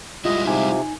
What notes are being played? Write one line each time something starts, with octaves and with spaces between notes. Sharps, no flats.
G3 G#3 E4 F4 D#5
C3 D#4 G#5